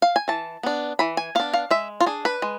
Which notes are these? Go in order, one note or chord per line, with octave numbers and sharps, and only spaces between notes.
F5
G#5
E3 A5
B3 D4
E3 B5
G#5
B3 D4 F5
F5
G#3 E5
F4
D4 G#4
B4
G#3